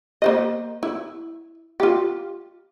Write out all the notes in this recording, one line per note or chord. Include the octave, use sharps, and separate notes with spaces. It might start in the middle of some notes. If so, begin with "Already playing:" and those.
A#3 C5 D#5
E4
F4 G4